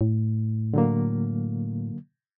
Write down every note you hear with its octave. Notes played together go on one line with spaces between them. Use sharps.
A2
D3 F#3 A#3